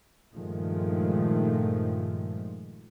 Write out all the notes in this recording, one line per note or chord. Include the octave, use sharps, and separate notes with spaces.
G2 A#2 D#3 F3 G#3 A3